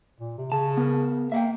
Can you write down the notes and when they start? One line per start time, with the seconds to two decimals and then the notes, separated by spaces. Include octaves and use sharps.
0.20 A#2
0.38 C3
0.52 C#3 A5
0.77 B3 A#4
1.32 A#3 E5 F5 G5